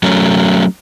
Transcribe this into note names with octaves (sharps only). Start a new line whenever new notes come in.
F#3 A3 C#4